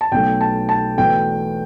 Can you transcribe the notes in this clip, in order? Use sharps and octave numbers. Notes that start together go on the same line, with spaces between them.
A5
B1 B2 A3 G5
A5
A5
E1 E2 B2 A3 G5